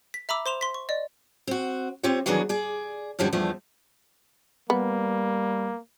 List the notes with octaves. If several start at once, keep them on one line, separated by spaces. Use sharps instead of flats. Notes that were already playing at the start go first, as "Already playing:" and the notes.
B6
E5 A#5 B5 D6 E6
C5 C6 E7 F7
C6 B6
C#6
D5 D#5
C4 F#4
C4 F4 G4 C5 C#5
D#3 E3 F#3 B3 D4 G#4
G#4 D5
F#2 D3 F3 G3 E4
E2 F3 A3 D4
G3 A#3 B3